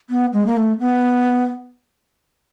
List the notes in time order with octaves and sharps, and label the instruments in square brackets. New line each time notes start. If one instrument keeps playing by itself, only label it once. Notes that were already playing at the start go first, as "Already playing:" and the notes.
[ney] B3
G#3
A#3
A3
B3